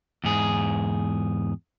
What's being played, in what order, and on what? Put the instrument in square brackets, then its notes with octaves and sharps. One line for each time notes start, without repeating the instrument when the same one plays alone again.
[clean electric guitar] E2 G#2 G#4